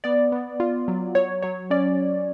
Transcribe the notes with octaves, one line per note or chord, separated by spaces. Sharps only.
B3 D5
B3
F4
F#3
F#3 C#5
F#3 C#5
C#4 D5